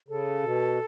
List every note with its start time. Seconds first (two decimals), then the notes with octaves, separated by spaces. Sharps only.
0.08 C#3 A4
0.43 B2